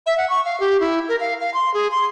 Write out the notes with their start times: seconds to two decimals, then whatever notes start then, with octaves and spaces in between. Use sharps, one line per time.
0.06 E5
0.18 F#5
0.30 C#6
0.45 F5
0.60 G4
0.80 E4
1.09 A#4
1.20 F5
1.40 F5
1.54 C6
1.74 G#4
1.91 C6